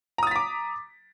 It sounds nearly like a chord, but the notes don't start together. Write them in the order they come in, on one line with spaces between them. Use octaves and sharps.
A#5 D#6 A6 B6 D6